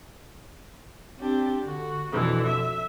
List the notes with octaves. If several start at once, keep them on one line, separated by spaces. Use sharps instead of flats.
C4 D4 G4
D3 F#4
F2 B2 D3 E3
E5